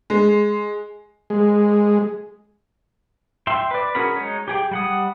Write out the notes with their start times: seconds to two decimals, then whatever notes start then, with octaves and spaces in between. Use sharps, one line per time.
0.10 G#3
1.30 G#3
3.47 E5 G5 C6
3.71 B4 D5
3.95 C#4 F#4 G#4 A#4 B5
4.16 G#3 D#4 C#5
4.48 G4 G#4 G5
4.71 G3 F#5 D#6